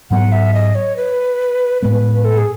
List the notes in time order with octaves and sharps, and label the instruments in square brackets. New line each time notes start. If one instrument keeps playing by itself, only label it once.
[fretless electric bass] G#2 F#3 B3 [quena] F#5
[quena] E5
D#5
C#5
B4
[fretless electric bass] A2 G#3 B3 [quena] B4
[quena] A4
G#4